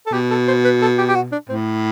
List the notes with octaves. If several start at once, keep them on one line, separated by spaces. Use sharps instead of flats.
A4
B2 G4
A4
C5
B4
A4
G4
G4
F#4
D4
A2 C4